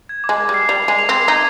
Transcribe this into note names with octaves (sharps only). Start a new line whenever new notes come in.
G#6
D6
G#3
G#6
G3
C7
G3 F7
G#3 C7
F7
C4 C7
D#4 G#6